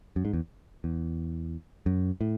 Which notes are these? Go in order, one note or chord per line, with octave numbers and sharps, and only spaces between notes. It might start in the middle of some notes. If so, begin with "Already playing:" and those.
F#2
G#2
E2
E2
F#2
A2